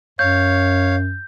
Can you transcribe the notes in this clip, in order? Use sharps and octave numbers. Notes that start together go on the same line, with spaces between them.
F#2 C#5 F5 G6